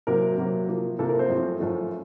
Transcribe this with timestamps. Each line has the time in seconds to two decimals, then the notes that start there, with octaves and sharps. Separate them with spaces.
0.07 C3 F#3 A#3 A#4
0.38 C3 F#3 A#3
0.68 C3 F3 A#3
0.99 C3 F3 A#3 A4
1.09 A#4
1.19 C4 C5
1.30 F#2 F3 A3
1.60 F#2 F3 A3